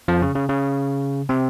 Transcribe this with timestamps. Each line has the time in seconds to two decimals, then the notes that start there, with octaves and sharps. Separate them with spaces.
0.08 F2 F3
0.22 C#3
0.35 C#3
0.49 C#3
1.29 C3 C4